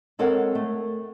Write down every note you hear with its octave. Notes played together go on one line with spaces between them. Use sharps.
G#3 C4 A4 A#4 C#5 F#5
A3